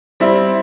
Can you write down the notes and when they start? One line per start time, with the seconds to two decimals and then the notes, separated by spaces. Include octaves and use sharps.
0.20 G3 C4 E4